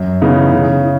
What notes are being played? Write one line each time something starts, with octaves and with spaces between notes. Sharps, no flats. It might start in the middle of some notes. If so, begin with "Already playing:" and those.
Already playing: F#2
C#3 E3 B3 D#4
C#3
E3